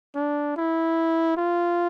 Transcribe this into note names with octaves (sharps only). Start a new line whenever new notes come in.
D4
E4
F4